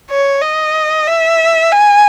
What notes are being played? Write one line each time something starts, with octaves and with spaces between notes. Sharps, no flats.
C#5
D#5
E5
G#5